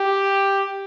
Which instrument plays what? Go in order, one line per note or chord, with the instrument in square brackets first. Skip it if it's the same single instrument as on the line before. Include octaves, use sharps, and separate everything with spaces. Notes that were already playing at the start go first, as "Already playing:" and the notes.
Already playing: [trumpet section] G4